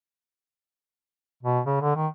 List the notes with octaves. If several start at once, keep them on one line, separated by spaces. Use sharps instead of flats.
B2
C#3
D3
D#3